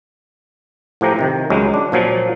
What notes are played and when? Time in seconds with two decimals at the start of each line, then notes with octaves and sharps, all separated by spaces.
1.01 A2 F3 G4 A#5
1.19 C3 D#3
1.50 C#2 F#3 G#3
1.74 D4
1.92 A#2 F3 F#3